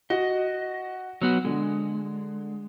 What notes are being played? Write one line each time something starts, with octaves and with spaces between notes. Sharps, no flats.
F#4 D#5
F#3 B3 F#4
D3 G#3